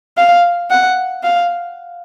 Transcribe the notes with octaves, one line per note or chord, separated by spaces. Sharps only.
F5
F#5
F5